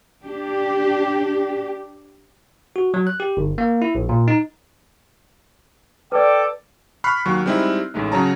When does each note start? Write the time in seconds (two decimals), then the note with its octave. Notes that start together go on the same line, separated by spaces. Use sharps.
0.23 D4 G4
2.76 F#4
2.94 F#3
3.07 F#6
3.20 G4
3.37 G1
3.58 A#3
3.82 E4
3.95 A#1
4.09 A#2
4.28 D#4
6.12 A4 B4 D5 G5 D6
7.04 B5 C#6 F6 F#6 C7
7.26 D#2 F#3 C#6
7.46 G3 G#3 C4 D#4 E4
7.94 A1 G#3 A3 D#4
8.12 C#3 F#3 C#5 A5 A#5